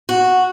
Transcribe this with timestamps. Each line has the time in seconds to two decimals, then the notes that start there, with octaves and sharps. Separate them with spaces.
0.09 F#4